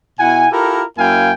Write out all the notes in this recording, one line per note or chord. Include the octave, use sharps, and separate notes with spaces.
B2 E4 F#5 G#5
E4 F4 G4 A4 A#4
F#2 A#3 E4 F5 G5 G#5